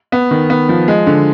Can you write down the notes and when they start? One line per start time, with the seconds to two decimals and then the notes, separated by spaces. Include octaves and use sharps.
0.12 B3
0.31 D#3
0.50 B3
0.69 F3
0.88 G#3
1.07 D3